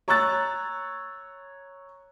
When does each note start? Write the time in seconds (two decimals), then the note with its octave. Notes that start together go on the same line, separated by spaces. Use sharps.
0.08 C#5 A#5 C#6 E6 F#6 A6